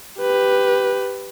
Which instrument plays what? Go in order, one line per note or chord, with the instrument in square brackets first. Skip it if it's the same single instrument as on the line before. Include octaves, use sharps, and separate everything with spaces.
[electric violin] G4 B4